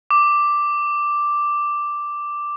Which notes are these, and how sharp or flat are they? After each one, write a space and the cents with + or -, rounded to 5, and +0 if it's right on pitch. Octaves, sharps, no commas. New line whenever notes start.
D6 +0